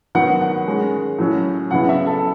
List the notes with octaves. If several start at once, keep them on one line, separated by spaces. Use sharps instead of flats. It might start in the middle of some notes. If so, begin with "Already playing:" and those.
D#3 F#3 B3 F#5
F#5
D#3 G#3 C#4
A2 F#3 C#4
C#3 F#3 B3 E4 F#5
E5
A4